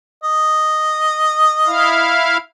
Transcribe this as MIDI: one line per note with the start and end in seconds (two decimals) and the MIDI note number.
0.23 2.17 75
1.66 2.37 64
1.66 2.37 77